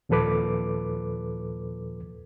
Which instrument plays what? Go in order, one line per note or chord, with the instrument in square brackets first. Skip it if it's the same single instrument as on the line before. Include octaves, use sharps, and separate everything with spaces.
[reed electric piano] D#2 A#2 F3 A4 B4 D6